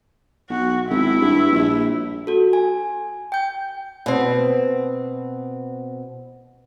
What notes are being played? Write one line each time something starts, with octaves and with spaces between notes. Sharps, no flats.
B1 F#4
G#1 E4
G2
A#1
F#4 A4
G#5
G5 G6
B2 C4